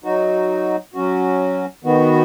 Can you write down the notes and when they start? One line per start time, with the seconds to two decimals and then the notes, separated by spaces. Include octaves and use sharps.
0.04 F#3 D#4 F#4
0.94 F#3 C#4 F#4
1.84 D#3 B3 F#4